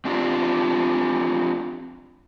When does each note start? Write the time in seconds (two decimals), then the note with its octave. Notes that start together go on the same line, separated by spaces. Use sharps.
0.05 C4 D4 F4 G4